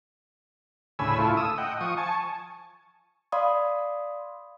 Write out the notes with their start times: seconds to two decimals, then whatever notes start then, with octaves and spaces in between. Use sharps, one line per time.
0.99 D2 A2 C#3 G#5 B5 E6
1.19 A2 A3 E4 F4
1.37 D#6 E6
1.58 D#5 F#5 G5
1.81 F3 C#6 D#6
1.98 G#5 A5 C#6
3.32 D5 F5 B5 C6 D#6